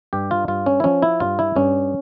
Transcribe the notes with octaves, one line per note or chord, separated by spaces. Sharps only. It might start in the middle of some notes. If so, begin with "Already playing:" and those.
G2 G4
F4
G2 F4
C#4
E4
F3 C#4
E4
G2 F4
E4
G2 C#4